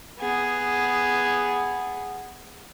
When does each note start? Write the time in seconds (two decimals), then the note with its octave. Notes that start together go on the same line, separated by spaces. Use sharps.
0.19 B3 G#4